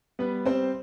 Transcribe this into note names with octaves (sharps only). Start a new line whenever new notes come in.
G3 B3 B4
G3 C4 C5